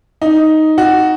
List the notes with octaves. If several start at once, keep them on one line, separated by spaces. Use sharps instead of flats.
D#4
F#4